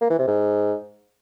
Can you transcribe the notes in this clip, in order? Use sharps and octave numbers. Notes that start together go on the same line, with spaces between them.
A#3
E3
C3
G#2